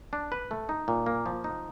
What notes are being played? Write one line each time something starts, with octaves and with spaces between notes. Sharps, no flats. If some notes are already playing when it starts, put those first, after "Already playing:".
D4
B4
A3
D#4
A#2
A#3
F3
D#4